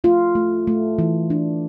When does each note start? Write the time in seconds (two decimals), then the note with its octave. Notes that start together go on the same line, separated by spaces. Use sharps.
0.04 A3 F4
0.35 A3
0.67 A3
0.98 E3
1.30 D4